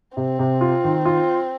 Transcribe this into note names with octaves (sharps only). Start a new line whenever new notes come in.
C3 C4
C3
F4
D#3
F4